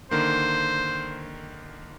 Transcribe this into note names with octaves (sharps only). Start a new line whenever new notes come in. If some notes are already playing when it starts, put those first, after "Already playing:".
D3 D#3 A#3 C5